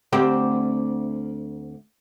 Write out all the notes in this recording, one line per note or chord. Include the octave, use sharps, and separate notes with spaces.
D2 C4 G4